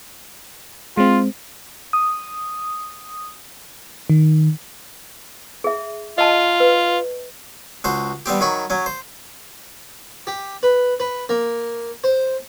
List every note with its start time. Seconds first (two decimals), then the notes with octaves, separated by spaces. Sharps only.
0.97 G#3 C4 F4
1.93 D#6
4.10 D#3
5.64 G#4 E5
6.18 F4 D#5 A5
6.60 B4
7.84 C#2 F#4 C5
8.26 G3 B3 C4 G4
8.40 D#3 F#3 B5 C#6
8.70 F#3 C#4
8.86 C5
10.27 G4
10.63 B4
11.00 B4
11.29 A#3
12.04 C5